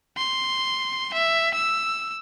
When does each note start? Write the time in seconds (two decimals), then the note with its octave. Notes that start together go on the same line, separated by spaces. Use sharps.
0.17 C6
1.13 E5
1.54 E6